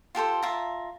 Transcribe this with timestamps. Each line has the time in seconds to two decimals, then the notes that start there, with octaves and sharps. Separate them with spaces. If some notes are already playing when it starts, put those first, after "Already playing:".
0.15 F4 G4 A4 C5
0.42 F4 E5 A5 A#5